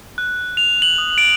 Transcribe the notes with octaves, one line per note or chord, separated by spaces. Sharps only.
F#6
F7
F#7
D#6
D7